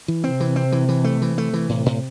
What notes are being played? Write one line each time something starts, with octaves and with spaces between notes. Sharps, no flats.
E3
C3 C4
E3
C4
E3
E3
A3
E3
A3
E3
A2 C3
A2